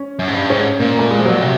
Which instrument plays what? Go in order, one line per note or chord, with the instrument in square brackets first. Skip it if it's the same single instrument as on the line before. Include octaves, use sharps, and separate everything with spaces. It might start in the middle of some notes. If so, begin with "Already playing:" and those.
Already playing: [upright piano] C#4
[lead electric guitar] F#2
G#2
G2
[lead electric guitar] G#2 [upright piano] C#4
[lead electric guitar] A#2 [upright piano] A#3
[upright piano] A3
G#3
F3
F#3
[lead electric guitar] C3